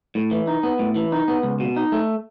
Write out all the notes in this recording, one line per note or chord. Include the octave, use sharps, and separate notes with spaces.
A2
E3
D#4
B3
A2
E3
D#4
B3
C#2
B2
D#4
A3